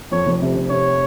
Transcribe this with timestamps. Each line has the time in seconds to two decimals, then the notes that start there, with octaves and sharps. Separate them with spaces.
0.11 F2 C#5
0.26 F1
0.42 C3
0.56 C3
0.70 C3 C#5